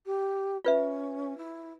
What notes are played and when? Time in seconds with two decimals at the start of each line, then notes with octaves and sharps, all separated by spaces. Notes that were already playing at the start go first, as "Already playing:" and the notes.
0.05 G4
0.65 C#4 F4 B4 E5
1.37 E4